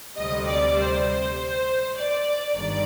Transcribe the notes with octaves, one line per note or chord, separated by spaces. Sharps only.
D2 C3 G3 D#5
D5
C5
C5
D5
G1 G2 D#3 D5